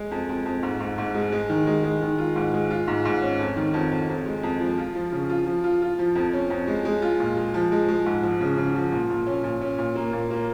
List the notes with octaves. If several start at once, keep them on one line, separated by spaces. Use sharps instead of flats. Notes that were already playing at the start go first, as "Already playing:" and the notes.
Already playing: G#3
F2
F2
F2
G#2
G#2
G#2
G#3
G#3
D#3
G#3
G#3
D#3
F4
G#2
G#3
F4
G#2
G#2
C#4
F2
D#3
F2
F2
F2
G#3
F2
F3
F4
F3
C#3
F4
F3
F4
F4
F3
F2
C#4
F2
G#3
G#3
F4
A#2
G#3
F3
G#3
G#3
G#2
F3
C#3
C#3
F3
A#2
A#2
C#4
A#2
C#4
A#2
A#3
A#2
A#3